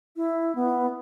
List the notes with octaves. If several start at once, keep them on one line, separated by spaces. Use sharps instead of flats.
E4
B3